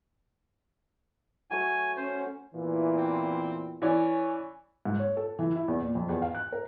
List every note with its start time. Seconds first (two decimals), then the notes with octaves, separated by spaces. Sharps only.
1.50 F#3 A3 C#5 G#5
1.97 C#4 C5
2.54 E2 A#2 E3
2.96 C4
3.82 E3 C#4 C#5 D5
4.85 G#2
4.99 C#5
5.17 A4
5.39 E3
5.55 E4
5.68 E2
5.81 A#2
5.95 F2
6.09 E2
6.22 F5
6.35 F#6
6.52 A#4